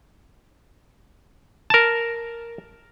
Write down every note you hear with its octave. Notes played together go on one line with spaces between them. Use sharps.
A#4 A5